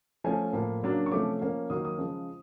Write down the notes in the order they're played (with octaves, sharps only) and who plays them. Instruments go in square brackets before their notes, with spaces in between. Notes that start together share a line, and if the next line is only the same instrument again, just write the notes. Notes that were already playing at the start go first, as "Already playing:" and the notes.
[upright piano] F3 A3 C#4 G#5
A2 F3 A#3
C#3 F#3 A#3 D4
C#6
C3 F3 A3 C#4 D6
F3 A#3 C#4
D#3 F#3 A#3 D#6
D#6
C#3 F3 G#3